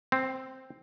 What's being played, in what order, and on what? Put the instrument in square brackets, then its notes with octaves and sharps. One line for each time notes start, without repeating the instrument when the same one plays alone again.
[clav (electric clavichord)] C4